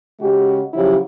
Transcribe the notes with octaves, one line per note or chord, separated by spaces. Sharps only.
C#3 G#3 F#4 G4
C#3 F3 F#3 E4 G4